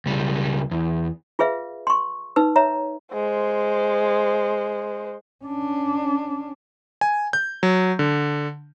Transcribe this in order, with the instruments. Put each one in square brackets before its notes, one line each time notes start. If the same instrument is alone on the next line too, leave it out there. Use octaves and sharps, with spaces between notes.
[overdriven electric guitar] C#2 G3
E2
[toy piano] F4 G#4 B4 E5 F5
C6 C#6
D#4 B4 E6
C#5 E5 A#5
[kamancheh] G#3 C5
[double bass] C#4 D4
[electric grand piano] G#5
G6
F#3
D3